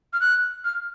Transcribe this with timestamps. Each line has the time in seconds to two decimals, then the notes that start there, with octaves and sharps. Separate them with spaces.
0.13 F6
0.21 F#6
0.65 F6